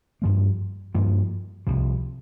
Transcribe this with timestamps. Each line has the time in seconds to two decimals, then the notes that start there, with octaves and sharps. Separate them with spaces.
0.22 G2 F3 A#3
0.95 G2 F3 A#3
1.67 C2 C3 F3